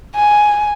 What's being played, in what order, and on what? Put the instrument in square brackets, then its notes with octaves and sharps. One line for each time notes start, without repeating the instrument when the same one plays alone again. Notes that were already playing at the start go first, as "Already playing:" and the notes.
[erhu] G#5